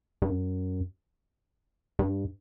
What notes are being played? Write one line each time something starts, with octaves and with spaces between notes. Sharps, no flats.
G2
F#2
G2